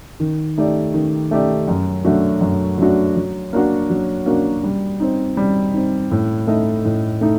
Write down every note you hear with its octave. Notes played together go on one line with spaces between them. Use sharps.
D#3
A3 D#4 G4 D5
D#3
A3 D#4 G4 D5
F#2
F#3 A3 D4 F#4
F#2
F#3 A3 D4 F#4
F#3
A#3 D4 F#4
F#3
A#3 D4 F#4
G3
C4 D#4
G3
C4 D#4
A2
A3 D#4 A4 D#5
A2
A3 D#4